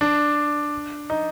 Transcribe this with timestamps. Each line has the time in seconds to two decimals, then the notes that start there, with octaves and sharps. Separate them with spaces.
0.01 D4
1.10 D#4